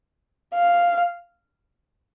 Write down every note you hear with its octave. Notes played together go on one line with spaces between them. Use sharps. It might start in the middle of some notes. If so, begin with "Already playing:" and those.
F5